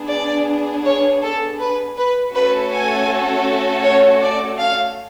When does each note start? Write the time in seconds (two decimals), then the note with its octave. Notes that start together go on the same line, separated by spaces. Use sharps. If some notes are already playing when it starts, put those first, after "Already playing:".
Already playing: B3 D4 G#4
0.10 D5
0.85 C#5
1.22 A4
1.60 B4
1.97 B4
2.34 A3 C#4 F#4 A4 B4
2.72 G#5
3.84 C#5
4.21 D5
4.59 F5